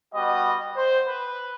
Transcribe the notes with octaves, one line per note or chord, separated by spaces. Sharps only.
G3 B3 F#4 D#5
C5
B4